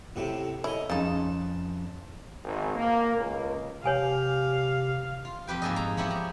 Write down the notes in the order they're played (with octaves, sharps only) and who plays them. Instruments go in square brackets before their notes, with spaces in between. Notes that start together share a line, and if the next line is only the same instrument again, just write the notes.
[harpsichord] A2 C3 E4 [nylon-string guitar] F#4 G4
[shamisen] E4 [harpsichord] C#5 D#5
[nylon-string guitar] F2 C#4 [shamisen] C#3 D#4 [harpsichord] A5
[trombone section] G#1
A#3
C#2
[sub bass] C3 [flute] G4 [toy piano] C#5 G#5 A5 [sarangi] F5
[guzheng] F4
F2 G4 B4 G5
G#2 A#3 G#4 A4 D#5
A#5
F3 B3 E4 G4 C#5
A#5